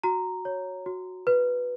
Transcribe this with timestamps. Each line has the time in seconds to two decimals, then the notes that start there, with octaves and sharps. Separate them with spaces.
0.04 F#4 A#5
0.45 C#5
0.86 F#4
1.27 B4